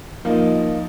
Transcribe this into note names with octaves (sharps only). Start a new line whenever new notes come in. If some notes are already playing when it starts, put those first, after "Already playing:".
F3 A#3 D#4